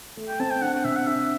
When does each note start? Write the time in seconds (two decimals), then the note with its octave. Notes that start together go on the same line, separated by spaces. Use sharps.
0.17 A3
0.28 G5
0.40 C4 A5
0.51 G5
0.62 D4 F#5
0.74 F#5
0.84 C3 E5
0.96 F#5
1.07 D4 E5